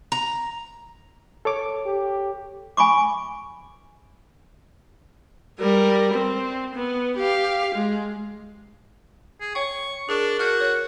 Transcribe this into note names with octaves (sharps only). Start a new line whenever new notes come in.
A#5
A4 C#5 D6
G4
G#5 B5 C#6 D6
G3 A#4
C4
B3
G4 F5
G#3
G#4
C#5 G5 C#6
D4 G#4 A#4 C#6
F#4 A#4 F6 G6
C#5 F#6